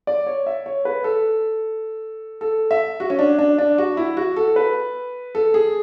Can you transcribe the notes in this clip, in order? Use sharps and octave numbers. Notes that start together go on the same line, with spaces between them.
D5
C#5
E5
C#5
B4
A4
A4
E5
F#4
C#4
D4
D4
D4
F#4
E4
F#4
A4
B4
A4
G#4